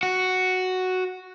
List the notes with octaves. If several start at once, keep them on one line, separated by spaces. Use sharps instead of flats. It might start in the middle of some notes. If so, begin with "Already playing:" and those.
F#4